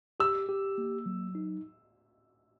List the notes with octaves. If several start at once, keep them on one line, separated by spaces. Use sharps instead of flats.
G4 E6
G4
A#3
F#3
D#4